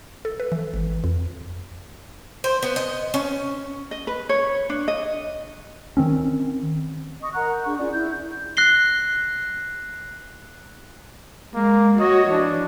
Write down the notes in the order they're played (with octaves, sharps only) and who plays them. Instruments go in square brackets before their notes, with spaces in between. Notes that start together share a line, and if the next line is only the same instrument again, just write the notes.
[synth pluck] A4
B4
E3
G#1
F2
[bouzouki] C5
B3
D#5
C#4
[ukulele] D#5
B4
C#5
D4
D#5
[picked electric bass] D#3 C4 C#4
[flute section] D#5 C#6 D#6
A#4 F#5 A#5 F#6
G6
D4 G#4 F#5 C#6
C#4 F4 G#4 D5
E4 G6
[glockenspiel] F#6 A#6 C7 G7
[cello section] G#3 [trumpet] A#3
[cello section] F#4 C#5 [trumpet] D#5
[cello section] E3 [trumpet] D4